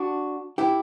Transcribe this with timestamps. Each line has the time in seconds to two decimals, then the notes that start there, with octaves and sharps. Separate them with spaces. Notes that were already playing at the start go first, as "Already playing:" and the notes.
Already playing: D4 F#4
0.58 E4 G4